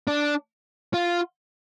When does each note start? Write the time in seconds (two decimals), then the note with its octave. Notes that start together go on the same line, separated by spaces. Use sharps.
0.07 D4
0.94 F4